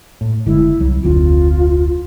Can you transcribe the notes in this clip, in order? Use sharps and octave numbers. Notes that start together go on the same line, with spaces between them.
A2
F#1 D3 G#3 E4
C2 F#3
F1 D2 C4 F4